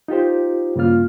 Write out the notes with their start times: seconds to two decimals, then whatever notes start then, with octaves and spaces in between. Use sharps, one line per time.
0.08 D#4 F4 G4 C5
0.76 G2 C#3 A#3 F4 F6